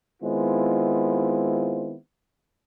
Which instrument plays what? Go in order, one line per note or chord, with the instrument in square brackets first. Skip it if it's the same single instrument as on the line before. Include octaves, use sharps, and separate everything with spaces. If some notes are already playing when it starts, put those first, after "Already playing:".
[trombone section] D#3 G#3 B3 C4 E4 F4